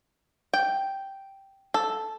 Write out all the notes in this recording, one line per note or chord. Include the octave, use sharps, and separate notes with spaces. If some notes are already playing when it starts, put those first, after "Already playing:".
G5
A4